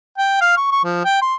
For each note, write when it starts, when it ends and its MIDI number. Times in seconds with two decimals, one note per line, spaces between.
0.18 0.38 79
0.41 0.56 77
0.57 0.70 85
0.72 0.82 85
0.85 1.00 53
1.05 1.17 79
1.22 1.35 84